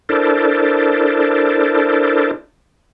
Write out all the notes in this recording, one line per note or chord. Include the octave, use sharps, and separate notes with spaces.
D4 E4 A4 A#4 C5 D5